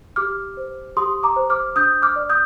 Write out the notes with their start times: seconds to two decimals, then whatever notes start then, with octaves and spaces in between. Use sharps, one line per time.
0.16 G4 D6 F6
0.57 C5
0.97 G4 C6 D#6
1.23 A#5 D6
1.36 C5
1.50 D6 F6
1.76 D4 D#6 G6
2.02 D6 F6
2.16 D5
2.29 D#6 G6